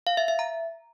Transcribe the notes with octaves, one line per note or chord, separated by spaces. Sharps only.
F5
E5
E5
A#5